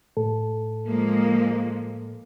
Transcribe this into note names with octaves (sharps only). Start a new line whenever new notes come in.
A2 A4
F3 G#3 A#3